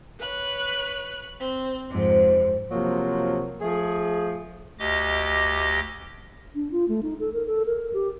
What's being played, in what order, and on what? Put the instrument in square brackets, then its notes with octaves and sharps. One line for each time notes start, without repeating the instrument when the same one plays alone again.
[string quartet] B4 C#5 F#6
C4
[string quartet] F2 G#2 [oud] C3
[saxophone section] C3 F3 F#3 A#3
F3 A3 G#4
[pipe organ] D2 G4 D#5 D6 A#6
[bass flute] D4
F4
A3
D#4
A4
A#4
A4
A#4
G4